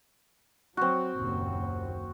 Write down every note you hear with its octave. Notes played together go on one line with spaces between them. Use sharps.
F#3 C4 F#4
F#1 D#2 A#2